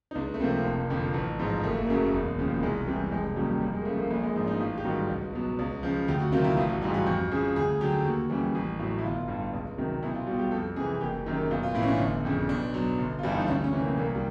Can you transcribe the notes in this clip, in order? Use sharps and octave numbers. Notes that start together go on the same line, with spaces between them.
D#4
C#2 D4
A3
C3 F3 A#3
F1
F2 D3 F3
A1
G#2 F3
F#1 A3
A#3
F#2 C#3 F#3 A3
E1
D#2 C#3 F3
C2 G#3
C3 E3 G3
F1 G#3
D#2 C#3 F#3 G3
F2 G3
G#3
A#3
C#3 F3 A3
A#3
A#1 A3
G#3
G#2 F3 D4
D#4
A1 F4
G4
G#2 D#3 G3 F#4
C#2
B2 F#3
C#2
C#3 F3
D2 G4
F#4
C3 D#3 F#3 F4
E4
A1 F4
F#4
G#2 E3 G3 F4
F#4
F2 F#4
C#3 F3 G#4
D2 G#4
D3 F#3 G4
D#2 F#4
C#3 E3 G3
A1
A2 F#3
E4
G1 F4
G2 D3
C#2
C3 D#3 F#3
B1 E4
F4
B2 G3 F#4
G4
F2 A4
C3 E3 G#4
F#1 G4
F#2 D#3
B1 F4
F4
A2 E3 C#4 E4
D4
G1
F2 C#3
B1 D4
B2 F#3
G1
F4
G2 E3 G3 E4
D#4
D4
D2 C#4
C#4
C3 E3
A#3
C2 A#3
G3